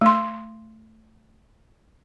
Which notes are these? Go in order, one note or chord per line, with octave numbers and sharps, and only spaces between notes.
A3 C6